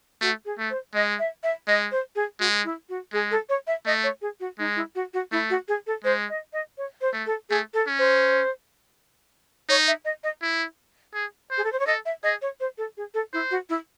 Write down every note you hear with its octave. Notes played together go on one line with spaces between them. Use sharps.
A3 F#4
G#4
A3
C5
G#3 D#5
E5
E5
G#3 D#5
C5
G#4
G#3 F#4
E4
F#4
G#3 G#4
A4
C#5
E5
A3 D#5
C#5
G#4
F#4
G#3 D#4
E4
F#4
F#4
A3 E4
F#4
G#4
A4
G#3 C5
D#5
D#5
C#5
C5
A3
A4
A3 G#4
A4
C#4
C5
D#4 C#5
E5
D#5
D#5
E4
G#4
C5
G#4
A4
C5
C#5
A4 D#5
E5
G#4 D#5
C#5
C5
A4
G#4
A4
E4 C5
F#4
E4